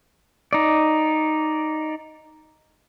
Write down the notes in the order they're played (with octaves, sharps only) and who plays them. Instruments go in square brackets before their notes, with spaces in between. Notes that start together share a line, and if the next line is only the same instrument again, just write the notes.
[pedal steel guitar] D#4 D5